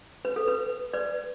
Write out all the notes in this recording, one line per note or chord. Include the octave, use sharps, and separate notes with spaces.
B4
A4
B4
B4 D5